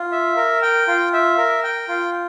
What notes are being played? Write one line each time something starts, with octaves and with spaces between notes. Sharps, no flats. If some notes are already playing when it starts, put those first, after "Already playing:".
Already playing: F4
E5
A#4
G5
F4
E5
A#4
G5
F4